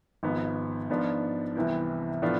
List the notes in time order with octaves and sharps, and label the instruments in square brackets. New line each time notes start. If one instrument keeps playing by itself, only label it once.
[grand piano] G#1 G#2 F3 B3
G#2 F3 B3 D4 F4
C2 C3 E3 B3 E4
A2 F3 B3 D4 F4